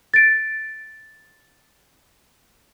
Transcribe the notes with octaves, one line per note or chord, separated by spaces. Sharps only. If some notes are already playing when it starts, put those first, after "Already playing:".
A6 D7